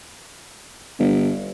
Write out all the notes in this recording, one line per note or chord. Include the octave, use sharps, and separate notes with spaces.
G1